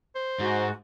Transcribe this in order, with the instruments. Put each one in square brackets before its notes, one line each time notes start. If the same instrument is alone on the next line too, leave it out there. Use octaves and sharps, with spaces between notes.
[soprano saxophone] C5
[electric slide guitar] G#2 [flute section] F#4